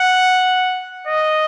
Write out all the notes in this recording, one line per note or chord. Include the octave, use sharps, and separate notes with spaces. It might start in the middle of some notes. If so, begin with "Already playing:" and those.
Already playing: F#5
D#5